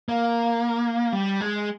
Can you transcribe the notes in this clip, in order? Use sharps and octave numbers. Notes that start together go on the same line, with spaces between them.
A#3
G3
G#3